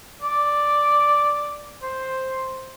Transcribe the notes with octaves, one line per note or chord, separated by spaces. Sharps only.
D5
C5